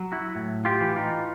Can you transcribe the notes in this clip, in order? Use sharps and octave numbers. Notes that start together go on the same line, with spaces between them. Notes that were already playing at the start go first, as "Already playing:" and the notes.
Already playing: F#3
E4 F#4
A2
F4 G4
E3
D#4 F4